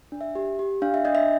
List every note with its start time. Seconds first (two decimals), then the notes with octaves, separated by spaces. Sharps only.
0.12 D4
0.21 E5
0.35 G4
0.59 G4
0.82 D4 F5
0.94 E5
1.05 D4 D#5
1.15 E5